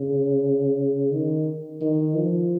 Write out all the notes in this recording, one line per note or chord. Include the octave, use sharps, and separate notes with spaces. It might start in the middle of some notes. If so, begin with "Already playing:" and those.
Already playing: C#3
D#3
D#3
F3